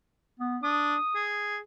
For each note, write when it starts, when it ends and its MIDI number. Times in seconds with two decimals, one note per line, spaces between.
0.40 0.57 59
0.63 0.96 62
0.63 1.26 87
1.15 1.59 68